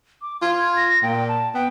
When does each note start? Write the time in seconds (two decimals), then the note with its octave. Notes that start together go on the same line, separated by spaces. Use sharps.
0.22 D6
0.42 F4 G#6
0.76 A#6
1.03 A#2 G5
1.28 A5
1.54 B3 G5